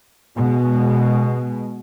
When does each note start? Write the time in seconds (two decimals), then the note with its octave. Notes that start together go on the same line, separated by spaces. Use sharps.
0.36 B2 G#3